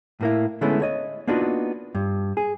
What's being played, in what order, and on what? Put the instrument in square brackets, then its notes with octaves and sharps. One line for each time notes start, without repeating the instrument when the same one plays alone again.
[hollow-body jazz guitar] A2 A#3 E4
D3 G#3 A3 B3 C#4 E4
C#5 D#5
A#3 B3 D4 D#4 F4 F#4
G2
G#4